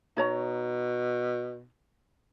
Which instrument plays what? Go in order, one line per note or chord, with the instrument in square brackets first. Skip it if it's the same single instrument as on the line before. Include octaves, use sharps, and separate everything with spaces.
[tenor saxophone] B2 [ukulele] D#4 C#5 A#5